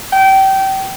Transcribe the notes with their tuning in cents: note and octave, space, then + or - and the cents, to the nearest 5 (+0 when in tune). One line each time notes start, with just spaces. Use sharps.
G5 -25